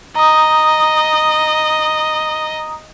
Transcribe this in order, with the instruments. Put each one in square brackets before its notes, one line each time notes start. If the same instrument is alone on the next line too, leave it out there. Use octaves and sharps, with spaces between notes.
[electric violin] D#5 [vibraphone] A#5 D#6